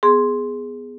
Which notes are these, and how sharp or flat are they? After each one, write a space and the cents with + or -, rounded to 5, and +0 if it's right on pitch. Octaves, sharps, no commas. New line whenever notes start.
B3 +10 G#4 +0 C6 +0